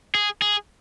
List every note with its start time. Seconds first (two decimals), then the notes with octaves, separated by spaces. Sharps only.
0.15 G#4
0.42 G#4